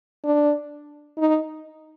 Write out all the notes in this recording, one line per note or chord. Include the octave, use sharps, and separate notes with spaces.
D4
D#4